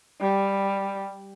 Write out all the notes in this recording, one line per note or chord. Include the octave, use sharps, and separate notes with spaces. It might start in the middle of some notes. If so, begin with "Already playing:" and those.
G3